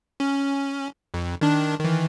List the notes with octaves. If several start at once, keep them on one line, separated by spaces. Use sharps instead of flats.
C#4
F2
D#3 D4
D#3 E3